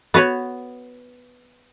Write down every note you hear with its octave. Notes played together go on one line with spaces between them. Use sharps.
B3 F#4 B4 C#5